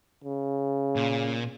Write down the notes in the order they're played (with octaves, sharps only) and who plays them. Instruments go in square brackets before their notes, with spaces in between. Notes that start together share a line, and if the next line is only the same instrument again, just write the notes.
[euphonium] C#3
[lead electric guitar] A#2